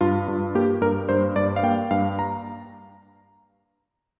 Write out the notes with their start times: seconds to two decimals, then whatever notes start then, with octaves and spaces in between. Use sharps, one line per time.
0.01 G2 F4
0.28 G2
0.55 A#3 G4
0.81 G2 A#4
1.09 G2 C5
1.36 G2 D5
1.56 F5
1.63 A#3 G5
1.91 G2 F5
2.19 A#5